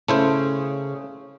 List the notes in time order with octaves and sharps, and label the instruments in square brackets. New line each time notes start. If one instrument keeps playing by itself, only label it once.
[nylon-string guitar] C#3 [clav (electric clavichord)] A3 E4 C5